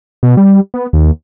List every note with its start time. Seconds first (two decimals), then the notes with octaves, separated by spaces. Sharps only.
0.23 B2
0.37 G3
0.74 B3
0.93 D#2